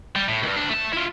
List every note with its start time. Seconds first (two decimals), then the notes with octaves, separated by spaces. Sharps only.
0.16 G3
0.28 A2
0.43 C#2 G2
0.56 D2 D4
0.69 A3 A5
0.93 E4 F4